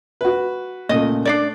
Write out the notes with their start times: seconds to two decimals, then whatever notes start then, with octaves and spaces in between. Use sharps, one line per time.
0.21 F#4 B4
0.89 A#2 C#3 A3 D#5
1.25 A3 D4 D#4 D5